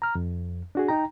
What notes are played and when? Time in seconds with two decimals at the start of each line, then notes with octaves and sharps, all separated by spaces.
0.02 A#5 F6
0.15 F2
0.75 D4 F#4 G#4
0.88 D#4 G5 A#5